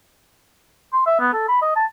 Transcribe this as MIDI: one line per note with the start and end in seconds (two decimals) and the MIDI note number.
0.93 1.04 84
1.07 1.18 76
1.20 1.33 59
1.33 1.47 69
1.48 1.58 83
1.62 1.73 75
1.76 1.85 81